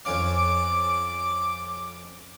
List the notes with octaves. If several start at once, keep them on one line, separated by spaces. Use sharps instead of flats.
F2 C#4 F5 D6